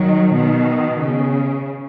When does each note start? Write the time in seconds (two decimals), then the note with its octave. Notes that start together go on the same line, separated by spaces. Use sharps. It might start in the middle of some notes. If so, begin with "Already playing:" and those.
Already playing: D#3 F#3
0.32 B2 D#3
1.00 C#3